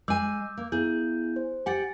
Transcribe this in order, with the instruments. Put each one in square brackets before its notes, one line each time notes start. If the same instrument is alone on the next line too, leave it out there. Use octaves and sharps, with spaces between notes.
[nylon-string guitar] G#3 G#5 [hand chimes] D6 E6 G6
[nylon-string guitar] A#3
[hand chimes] B3 E4 G6 [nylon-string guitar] G#4
[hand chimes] C5
[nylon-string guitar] G4 F#5 [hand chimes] G#5 A6